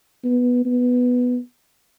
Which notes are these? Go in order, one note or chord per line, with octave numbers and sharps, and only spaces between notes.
B3
B3